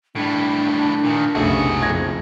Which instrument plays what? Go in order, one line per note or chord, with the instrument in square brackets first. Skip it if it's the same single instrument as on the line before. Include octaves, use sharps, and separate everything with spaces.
[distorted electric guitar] A2 G3 [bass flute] D4
[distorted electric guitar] A#2 D#3
[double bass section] F1 B1 [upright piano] C#3 A3 [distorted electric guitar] F#4 G#4
[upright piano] F#1 G#6 A#6 [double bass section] F2